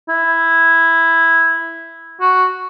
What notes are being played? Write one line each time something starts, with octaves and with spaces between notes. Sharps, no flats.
E4
F#4